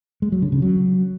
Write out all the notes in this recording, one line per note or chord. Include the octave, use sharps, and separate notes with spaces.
G#3
F#3
D3
C#3
F#3